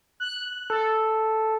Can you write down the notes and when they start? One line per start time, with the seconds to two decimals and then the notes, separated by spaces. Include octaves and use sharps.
0.20 F#6
0.70 A4